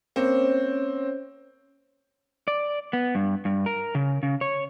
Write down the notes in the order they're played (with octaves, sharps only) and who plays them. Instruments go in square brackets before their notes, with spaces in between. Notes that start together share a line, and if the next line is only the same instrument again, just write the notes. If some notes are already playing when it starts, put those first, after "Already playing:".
[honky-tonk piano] A#3 C4 [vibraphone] C#4 C5 C#5
[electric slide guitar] D5
B3
G2
G2
A#4
C#3
C#3
C#5